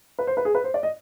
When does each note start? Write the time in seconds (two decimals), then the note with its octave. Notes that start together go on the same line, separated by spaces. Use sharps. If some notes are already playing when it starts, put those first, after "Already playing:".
0.19 B4
0.27 C5
0.37 B4
0.45 G#4
0.55 B4
0.64 C5
0.74 D5
0.83 D#5